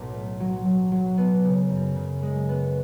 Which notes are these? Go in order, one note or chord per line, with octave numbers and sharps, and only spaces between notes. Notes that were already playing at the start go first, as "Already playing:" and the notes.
Already playing: B1 A2
A3
F#3
F#3
F#3
B3
C#3
F#2
C#3
G#3
B3